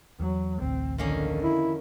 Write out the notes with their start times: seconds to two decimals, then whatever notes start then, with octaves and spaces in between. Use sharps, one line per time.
0.20 E2 F#3
0.62 A1 D2 C4
0.98 F2 D3 D#3 A#3 C#4
1.43 E4